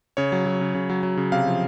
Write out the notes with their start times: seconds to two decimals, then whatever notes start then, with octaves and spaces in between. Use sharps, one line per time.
0.17 C#3 C#5
0.32 F#3
0.46 F#3
0.61 C#3
0.75 C#3
0.90 F#3
1.03 F#3
1.17 C#3
1.32 C3 F5
1.47 F3